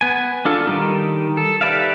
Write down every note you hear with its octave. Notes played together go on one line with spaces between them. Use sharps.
B3 G#5
D4 F4 A4
D#3 G3 D#4
A4
G4 B4 D5 E5 F5